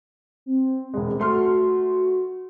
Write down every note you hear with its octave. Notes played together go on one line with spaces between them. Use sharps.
C4
E1 G#3
A3 F#4 C6 F6